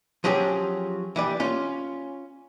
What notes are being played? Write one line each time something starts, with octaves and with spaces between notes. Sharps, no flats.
F3 F#3 C#4 G4 G#4
E3 G3 D5
C#4 F4